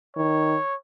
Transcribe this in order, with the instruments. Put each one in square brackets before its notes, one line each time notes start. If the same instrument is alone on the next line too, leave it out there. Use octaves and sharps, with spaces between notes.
[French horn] D#3 [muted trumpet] C#5